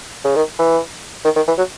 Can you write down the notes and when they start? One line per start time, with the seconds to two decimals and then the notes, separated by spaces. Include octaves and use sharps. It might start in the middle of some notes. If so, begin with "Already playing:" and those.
0.25 C#3
0.36 D#3
0.59 E3
1.25 D#3
1.36 D#3
1.48 E3
1.58 F#3